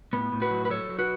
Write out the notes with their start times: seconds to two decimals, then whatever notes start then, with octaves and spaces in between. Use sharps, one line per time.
0.13 A2 B3
0.32 A2
0.42 F#4 B4
0.51 F#3
0.65 B4
0.70 F#3 A4 C#5
0.89 F#3
0.99 F#4 B4